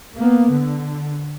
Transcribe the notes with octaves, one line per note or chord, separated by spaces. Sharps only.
A#3 B3
D3